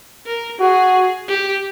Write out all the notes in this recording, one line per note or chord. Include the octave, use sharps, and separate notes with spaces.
A#4
F#4 G#4
G4